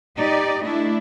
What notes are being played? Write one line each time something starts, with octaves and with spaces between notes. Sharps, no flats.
D#4 G4 D5 D#5
A3 D4 E4